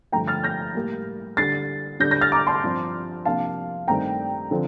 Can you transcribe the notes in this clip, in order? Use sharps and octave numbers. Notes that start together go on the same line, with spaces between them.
G2 D3 F3 A3 G5 A#5
F6 A6
G6 A#6
A2 G3 A#3
D3 G3 D4 A6 C7
D3 G3 D4 G6 A#6
G6 A#6
F6 A6
A#5 D6
A5 C6
G2 F3 C4
C3 F3 A#3 D4 F5 A5
G2 D#3 A3 C4 G5 A#5
D3 F3 C4